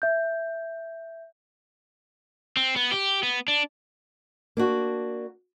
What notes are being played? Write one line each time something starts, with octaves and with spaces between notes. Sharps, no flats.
E5 G6
C4
B3
G4
B3
D4
A#3 D4 F#4